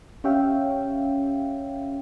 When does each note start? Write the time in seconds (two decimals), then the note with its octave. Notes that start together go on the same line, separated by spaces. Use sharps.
0.24 C#4 G4 C#5 E5 F5 G5